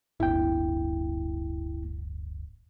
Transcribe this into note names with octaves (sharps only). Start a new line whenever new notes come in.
D1 G1 E4 G5